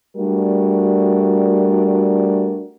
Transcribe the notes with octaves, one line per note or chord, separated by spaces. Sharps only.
G3 A3 D4 F#4 A#4